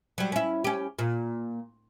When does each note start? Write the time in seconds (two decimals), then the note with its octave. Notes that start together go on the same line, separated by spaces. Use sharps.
0.18 F#3 G3
0.32 C#4 E4
0.64 C#4 G4
0.99 A#2